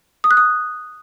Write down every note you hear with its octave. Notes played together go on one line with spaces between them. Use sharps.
D#6
F#6
D#6